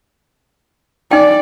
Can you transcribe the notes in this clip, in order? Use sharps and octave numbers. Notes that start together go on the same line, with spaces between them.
D#4 D5 G5